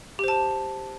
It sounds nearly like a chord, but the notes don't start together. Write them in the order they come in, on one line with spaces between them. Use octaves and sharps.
G4 C5 A5